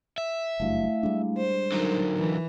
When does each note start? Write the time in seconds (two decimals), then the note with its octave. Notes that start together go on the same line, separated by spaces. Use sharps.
0.18 E5
0.60 F#1 G2 F#3 A3 E4 F5
1.03 G3 G#3 D4
1.37 C5
1.72 D3 F#3 D#4 A#4
2.17 E3